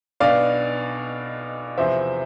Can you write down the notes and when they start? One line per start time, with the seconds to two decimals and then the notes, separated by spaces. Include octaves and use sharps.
0.20 B1 B2 B3 D4 D5 F5
1.78 E2 C3 F3 C5 E5